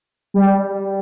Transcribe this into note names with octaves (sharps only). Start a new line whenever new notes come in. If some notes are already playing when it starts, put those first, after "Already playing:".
G3